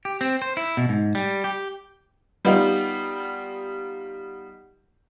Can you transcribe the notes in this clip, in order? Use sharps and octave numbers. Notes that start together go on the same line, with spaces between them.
G4
C4
C5
E4
B2
G#2
G3
G4
G3 B3 D#4 F4 G4